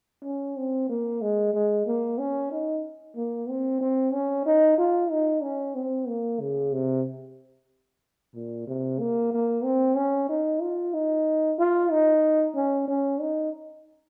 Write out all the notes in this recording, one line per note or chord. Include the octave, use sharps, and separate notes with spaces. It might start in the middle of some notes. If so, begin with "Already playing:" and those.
C#4
C4
A#3
G#3
G#3
A#3
C#4
D#4
A#3
C4
C4
C#4
D#4
F4
D#4
C#4
C4
A#3
C#3
C3
A#2
C3
A#3
A#3
C4
C#4
D#4
F4
D#4
F4
D#4
C#4
C#4
D#4